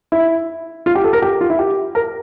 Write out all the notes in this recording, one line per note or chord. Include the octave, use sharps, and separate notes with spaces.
E4
F4
G4
A4
A#4
G4
F4
E4
G4
A#4